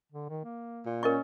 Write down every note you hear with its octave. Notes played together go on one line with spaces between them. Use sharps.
D3
D#3
A#3
A#2
C#4 A#4 D#5 C#6